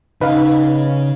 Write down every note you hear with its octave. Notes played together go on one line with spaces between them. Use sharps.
C#3 D#4 B4 F5